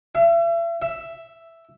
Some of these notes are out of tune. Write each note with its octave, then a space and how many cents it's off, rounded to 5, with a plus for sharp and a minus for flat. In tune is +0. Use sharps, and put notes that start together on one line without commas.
E5 +40
E5 +5